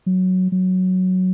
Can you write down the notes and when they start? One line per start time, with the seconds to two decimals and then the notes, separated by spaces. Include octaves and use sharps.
0.06 F#3
0.52 F#3